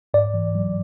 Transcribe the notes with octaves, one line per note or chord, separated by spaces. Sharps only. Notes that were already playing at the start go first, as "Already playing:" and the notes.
G#2 D5
E3
F#3